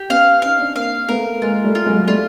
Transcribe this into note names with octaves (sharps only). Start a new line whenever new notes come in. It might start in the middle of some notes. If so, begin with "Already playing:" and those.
Already playing: G4
B3 C#4 F5
C#4 D#4 F5
C4 D4
A#3 C4 F5
A3 B3 A#4
G#3 A#3 F4
G3 A3
F4
F#3 G#3
G#3
G3 A3 F4